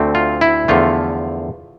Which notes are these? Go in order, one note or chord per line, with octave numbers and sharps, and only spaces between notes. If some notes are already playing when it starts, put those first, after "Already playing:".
Already playing: D2 D3 A3 C4
F4
E4
E2 D3 F3 A3 F4